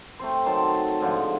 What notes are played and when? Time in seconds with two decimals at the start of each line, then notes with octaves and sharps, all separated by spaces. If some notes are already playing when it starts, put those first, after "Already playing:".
0.19 A3 C4 C5
0.46 D#3 F#3 A5 C6
1.01 G#2 D3 F3